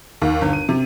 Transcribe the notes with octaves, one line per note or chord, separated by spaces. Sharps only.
D#2
G1
D#7
C3